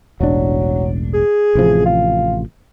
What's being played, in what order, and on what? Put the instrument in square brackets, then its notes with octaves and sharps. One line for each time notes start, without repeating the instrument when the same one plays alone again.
[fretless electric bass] E1 A1 D4 [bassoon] F#3
[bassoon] G#4
[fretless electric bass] A1 C3 F3
[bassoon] F4